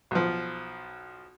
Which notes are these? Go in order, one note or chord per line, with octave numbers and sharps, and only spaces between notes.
B1 F3